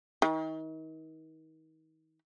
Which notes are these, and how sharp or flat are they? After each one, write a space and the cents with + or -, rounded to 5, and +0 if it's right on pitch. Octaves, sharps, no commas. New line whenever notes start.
D#3 +35